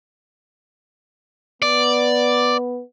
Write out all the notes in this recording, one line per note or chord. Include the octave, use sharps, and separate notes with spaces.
B3 D5